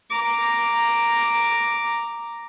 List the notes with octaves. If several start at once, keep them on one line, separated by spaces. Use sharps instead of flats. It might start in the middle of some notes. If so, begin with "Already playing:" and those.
A#5 D6